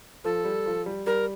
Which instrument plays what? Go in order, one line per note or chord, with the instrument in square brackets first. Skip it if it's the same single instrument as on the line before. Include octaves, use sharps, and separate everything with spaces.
[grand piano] F3 [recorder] A4
[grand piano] G3
F3
G3
[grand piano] G3 [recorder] A#4